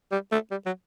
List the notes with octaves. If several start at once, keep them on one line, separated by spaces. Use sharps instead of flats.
G3
A3
G3
F#3